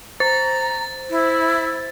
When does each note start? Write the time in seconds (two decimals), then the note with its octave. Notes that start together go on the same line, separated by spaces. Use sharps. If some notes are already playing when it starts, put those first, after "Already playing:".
0.20 C5 A#5 A6
1.10 E4